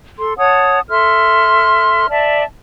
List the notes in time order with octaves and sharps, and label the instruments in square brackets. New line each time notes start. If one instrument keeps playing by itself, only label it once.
[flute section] A4 C6
C#5 F#5 A5 D#6
A4 E5 C6 F6
D5 E5 A5